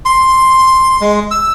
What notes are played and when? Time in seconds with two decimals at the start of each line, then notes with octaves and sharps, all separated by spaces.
0.05 C6
1.01 G#3
1.31 E6